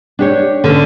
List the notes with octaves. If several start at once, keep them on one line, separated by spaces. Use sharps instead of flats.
D4 G4 C#5
D3 C#4